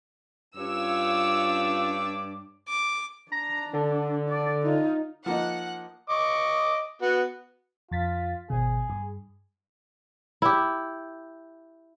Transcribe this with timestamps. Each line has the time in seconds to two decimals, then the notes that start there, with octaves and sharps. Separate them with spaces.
0.57 G2 C#4 F4 C#5 D6 E6
2.68 D6
3.32 D4 A#5
3.73 D3
4.29 D5
4.63 D#4 F4
5.26 F3 A#3 D#4 F#5
6.09 D#5 C#6 D6
7.02 B3 F#4
7.92 F2 F4 A6 B6
8.50 G#1 B2 G#4
8.90 G2
10.42 E4 G4